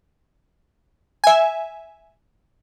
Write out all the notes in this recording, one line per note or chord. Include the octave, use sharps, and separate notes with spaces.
E5 G#5